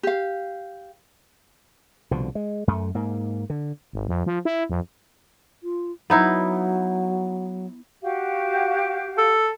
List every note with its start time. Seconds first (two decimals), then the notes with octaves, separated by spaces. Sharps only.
0.03 G4 F5
2.11 C2 B2 D3 F3
2.35 G#3
2.67 F#2 A3
2.95 G#2 A#3
3.50 D3
3.93 G#1
4.08 F2
4.26 F3
4.45 E4
4.70 F2
5.63 F4
6.10 F#3 B3 D#4 E4
8.02 F#4 G4 F5
9.17 A4